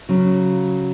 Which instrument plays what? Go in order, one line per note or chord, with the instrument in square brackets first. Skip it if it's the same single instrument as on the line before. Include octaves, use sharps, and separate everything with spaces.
[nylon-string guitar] C#3 F#3 C#4